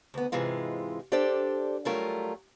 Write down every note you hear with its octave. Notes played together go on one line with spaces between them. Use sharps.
D2 B3
G#2 C3 E3 G#3 F4
D4 G4 A4 C5 D5
F#3 G3 A3 F4 A#4